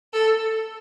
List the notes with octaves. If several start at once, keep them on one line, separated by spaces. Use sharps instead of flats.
A4